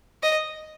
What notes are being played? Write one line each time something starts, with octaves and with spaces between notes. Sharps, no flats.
D#5